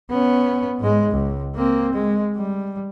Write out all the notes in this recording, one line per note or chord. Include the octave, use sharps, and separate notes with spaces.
B3 C#4
G#2 G#3
C#2
A#3 C4
G#3
G3